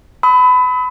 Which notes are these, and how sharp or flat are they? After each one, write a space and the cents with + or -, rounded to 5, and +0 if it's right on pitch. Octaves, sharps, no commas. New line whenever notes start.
B5 +25 D#6 +45